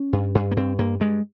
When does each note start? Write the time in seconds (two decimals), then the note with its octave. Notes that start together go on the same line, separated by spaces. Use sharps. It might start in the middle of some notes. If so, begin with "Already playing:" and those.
Already playing: C#4
0.13 G2
0.35 G2
0.51 A#3
0.57 G2 C4
0.78 G2 A#3
1.00 G2 G#3